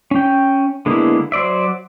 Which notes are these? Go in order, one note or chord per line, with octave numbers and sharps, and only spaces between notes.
C#4 G5
D3 G#3 A#3 B3 E4
F#3 C5 D5 E5